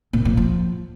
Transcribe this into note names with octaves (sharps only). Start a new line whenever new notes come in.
A#2
F3
F3